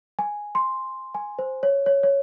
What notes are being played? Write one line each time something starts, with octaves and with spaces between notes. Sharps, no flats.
G#5
C6
G#5
C5
C#5
C#5
C#5